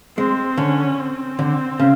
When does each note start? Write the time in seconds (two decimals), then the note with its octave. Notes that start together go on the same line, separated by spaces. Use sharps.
0.17 G#3 C4
0.57 D3 C#4
0.99 C4
1.39 D3
1.79 C#3